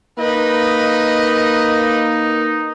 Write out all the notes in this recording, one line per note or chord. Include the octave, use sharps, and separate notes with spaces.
A#3 D#4 B4 D#5